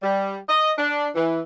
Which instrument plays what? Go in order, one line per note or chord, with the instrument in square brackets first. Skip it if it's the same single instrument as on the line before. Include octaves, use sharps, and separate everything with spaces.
[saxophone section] G3
D#5
D4
E3